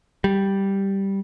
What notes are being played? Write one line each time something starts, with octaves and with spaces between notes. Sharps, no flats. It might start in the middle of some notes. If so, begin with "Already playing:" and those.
G3